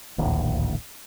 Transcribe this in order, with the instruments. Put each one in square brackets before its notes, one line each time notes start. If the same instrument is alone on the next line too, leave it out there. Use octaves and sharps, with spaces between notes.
[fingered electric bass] D1 A#1 D#2